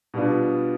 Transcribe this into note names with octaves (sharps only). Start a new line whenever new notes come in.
B2 G3 B3 D4 F4